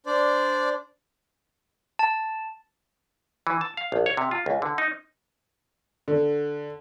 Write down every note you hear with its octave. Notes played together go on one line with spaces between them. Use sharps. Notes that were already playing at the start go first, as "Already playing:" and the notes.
D4 C5 D5
A5
E3
A5
F5
A#1
C#5
C3
F4
C#2
D3
D#4
D3